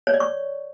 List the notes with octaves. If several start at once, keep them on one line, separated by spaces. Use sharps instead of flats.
C#5
D5
C#6